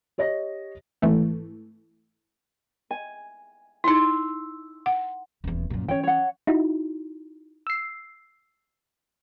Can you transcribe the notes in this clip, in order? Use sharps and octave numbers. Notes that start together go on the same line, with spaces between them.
G4 C#5 D#5 A#6
G#1 E3 A3
G#5
D#4 E4 C6 E6
F#5
D#1 E2
F#2 A#2
E3 C#4 C#5 G5
C#5 F#5
D#4 E4 F#4
E6 C7